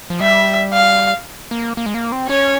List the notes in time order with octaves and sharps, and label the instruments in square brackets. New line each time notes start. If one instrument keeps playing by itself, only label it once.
[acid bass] F3
[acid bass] G3 [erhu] E5
[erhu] F5
[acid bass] A#3
A#3
G#3
A#3
C4
[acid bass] C#4 [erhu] C#5